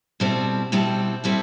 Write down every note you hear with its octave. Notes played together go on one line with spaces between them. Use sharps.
B2 G3 C4 E4 A4
B2 G3 C4 E4 A4
B2 G3 C4 E4 A4